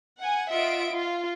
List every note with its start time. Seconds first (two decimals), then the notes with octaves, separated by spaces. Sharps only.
0.20 F#5 G#5
0.50 F4 D#5 E5 F#5 D7
0.93 F4